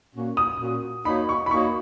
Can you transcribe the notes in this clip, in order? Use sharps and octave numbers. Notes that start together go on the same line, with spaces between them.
A#2 A#3 C#4 F#4
D#6
A#2 A#3 C#4 F#4
A#3 D#4 F#4 C#5 B5
C#6
B5
A#3 D#4 F#4 C#5 C#6